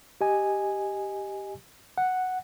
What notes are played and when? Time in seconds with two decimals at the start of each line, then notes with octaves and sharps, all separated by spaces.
0.21 G4 D#5 G#5
1.98 F#5